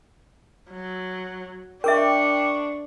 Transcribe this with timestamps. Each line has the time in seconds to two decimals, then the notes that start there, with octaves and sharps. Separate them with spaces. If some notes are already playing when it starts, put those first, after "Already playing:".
0.71 F#3
1.84 D4 A#4 E5 G5 C#6 D6